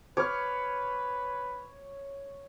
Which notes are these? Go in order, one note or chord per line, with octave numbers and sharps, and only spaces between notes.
B4 C#5 D6 F6